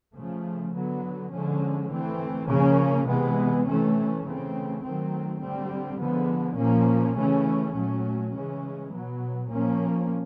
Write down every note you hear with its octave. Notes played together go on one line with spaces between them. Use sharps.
C#3 F3 A3
D3 F#3 B3
D3 F3 G#3 C#4
E3 A3 C4
C#3 F3 A#3 C#4
C3 E3 G#3 B3
C3 E3 A3 C#4
C#3 E3 A3 C4
D#3 F#3 A3 C4
D3 G3 C4
D3 F3 G#3 B3
A#2 F3 A#3 C#4
C#3 E3 A3 C#4
A#2 F#3 A3 C#4
C#3 E3 G#3 C#4
B2 F#3 B3
A#2 F3 A#3 C#4